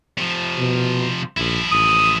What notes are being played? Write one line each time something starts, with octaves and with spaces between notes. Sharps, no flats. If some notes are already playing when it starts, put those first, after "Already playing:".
C3 F3
B2
A#1 F3 E4
A1 D#6